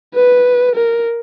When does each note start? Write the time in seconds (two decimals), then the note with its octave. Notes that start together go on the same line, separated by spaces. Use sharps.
0.15 B4
0.75 A#4